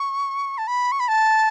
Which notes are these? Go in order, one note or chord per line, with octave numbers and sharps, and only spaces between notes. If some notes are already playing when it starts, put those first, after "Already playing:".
Already playing: C#6
A5
B5
C#6
B5
A5